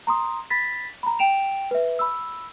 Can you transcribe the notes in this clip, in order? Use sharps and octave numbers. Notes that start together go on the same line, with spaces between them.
A#5 C6 D#6
B5 A6 B6
A#5 B5
G5 D7 E7 F7
B4 E5
B5 E6